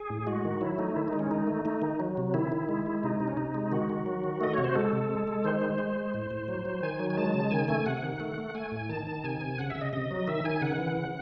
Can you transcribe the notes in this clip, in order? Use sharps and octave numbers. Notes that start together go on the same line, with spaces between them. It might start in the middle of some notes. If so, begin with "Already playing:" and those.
Already playing: G#4
A2
G#3 F#4
D#3
F#3 E4
A3 D#4
D#3 E4
G#3 D#4
C#4
D#3 D#4
A3
A3 D#4
D#3
F#3
C3
D#3 E4
D#3
G#3
G#3
C3 D#4
C3
C#4
C3 D#4
G#3
D#3 F#4
D#3
F#3
D#3
A3 D#5
C3 C#5
C5
G#3 A4
C3
G#3
G#3
D#3 C5
G#3
G#3
G#3
A2
A2
F#3
F#3
D#3 G#5
F#3
G#5
G#3 A5
C#3
D#3 G#5
A3 G#5
C3 F#5
D#3
A3
A3
A3 G#5
A2
D#3 A5
D#3
C3 G#5
C3
C#3 F#5
E5
C#3
D#5
C3 D#5
F#3
D#3 E5
D#3 G#5
C#3 F#5
E3
C#3